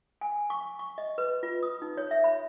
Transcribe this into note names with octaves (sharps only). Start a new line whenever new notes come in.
G#5
C#6
C#6
D#5
B4
F4
D#6
D#4
C#5
E5
B5